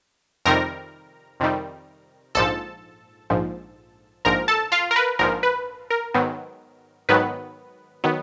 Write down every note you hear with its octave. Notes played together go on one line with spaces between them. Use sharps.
F2 C3 D#3 G3 A#4 A#5
F2 C3 D#3 G3
A#1 G#2 F3 A4 A5
A#1 G#2 F3
A#1 G#2 F3 A#4 A#5
A4 A5
F4 F5
A#4
B4
A#1 G#2 F3 A#4
B4
A#4
G#2 D#3 F#3 B3
G#2 D#3 F#3 B3 B4
D#3 F#3 B3